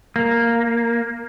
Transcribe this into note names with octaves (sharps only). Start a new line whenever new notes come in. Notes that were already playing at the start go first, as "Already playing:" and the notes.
A#3